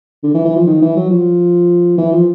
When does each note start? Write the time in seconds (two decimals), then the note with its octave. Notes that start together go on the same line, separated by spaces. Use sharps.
0.23 D3
0.34 E3
0.45 E3
0.56 F3
0.67 D#3
0.82 E3
0.96 F#3
1.10 F3
1.98 E3
2.12 F3